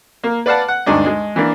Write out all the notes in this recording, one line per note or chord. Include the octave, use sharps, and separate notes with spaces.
A#3
B4 D5 F5 F#5 A5
F#5
D2 G2 G#3 D4 D#4
G#3
E3 A#3 D4